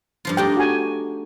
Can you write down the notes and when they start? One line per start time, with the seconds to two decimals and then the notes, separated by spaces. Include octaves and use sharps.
0.25 G2 F3 F4
0.37 A3 D4 D#4 G4 G5
0.57 F#4 G#5